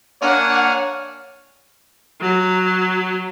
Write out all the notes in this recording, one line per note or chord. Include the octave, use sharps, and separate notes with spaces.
A#3 D4 C#5 F#5 G#5 A#5 F6
F#3